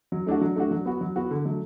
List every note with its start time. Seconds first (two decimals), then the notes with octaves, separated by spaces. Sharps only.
0.12 F#3
0.27 A3 D4 F#4
0.41 F#3
0.56 A3 D4 F#4
0.71 F#3
0.85 B3 F#4
1.01 F#3
1.16 B3 F#4
1.31 D3
1.45 F#3 A3